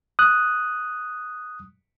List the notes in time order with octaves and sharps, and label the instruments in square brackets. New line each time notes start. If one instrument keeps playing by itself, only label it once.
[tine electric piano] D#6 F#6